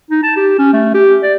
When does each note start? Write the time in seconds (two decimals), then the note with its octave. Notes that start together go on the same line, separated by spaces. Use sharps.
0.11 D#4
0.23 A5
0.36 G4
0.59 C#4
0.73 A3
0.94 G4
1.23 D5